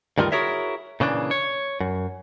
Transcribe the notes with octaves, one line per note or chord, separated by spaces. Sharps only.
D2 G2 D#3 G3 F4 A#4
E4 F#4 G#4 A#4 C#5 E5
A#2 C#3 E3 D4
C#5
F#2